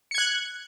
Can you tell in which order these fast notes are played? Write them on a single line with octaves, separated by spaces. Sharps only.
C#7 G#6 F#6